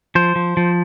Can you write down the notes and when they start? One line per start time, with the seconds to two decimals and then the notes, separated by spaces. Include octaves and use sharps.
0.15 F3 C5
0.36 F3
0.57 F3